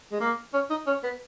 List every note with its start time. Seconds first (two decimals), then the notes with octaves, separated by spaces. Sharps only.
0.12 G#3
0.20 A#3
0.54 C#4
0.70 D#4
0.87 C#4
1.04 B3